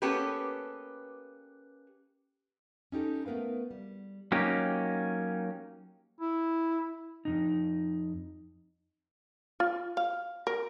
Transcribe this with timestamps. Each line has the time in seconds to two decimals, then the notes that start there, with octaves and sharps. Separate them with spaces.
0.02 A#3 B3 C#4 G4 A4 B4
2.92 C#4 D#4 G4 A4
3.26 A3 B3 A#4 B4 F5
3.71 G3
4.32 F#3 A#3 C#4 D#4 G4
6.21 E4
7.25 F2 C3 D#4
9.60 F4
9.97 F5
10.47 A#4